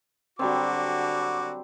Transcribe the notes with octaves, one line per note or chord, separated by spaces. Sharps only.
D3 F#3 G3 C4 F#4 D6